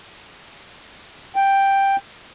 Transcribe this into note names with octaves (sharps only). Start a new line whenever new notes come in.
G5